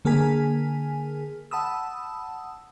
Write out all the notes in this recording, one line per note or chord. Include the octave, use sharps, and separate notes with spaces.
D3 A#3 G#4 A#4 G#5 B6
F#5 A5 B5 D#6 E6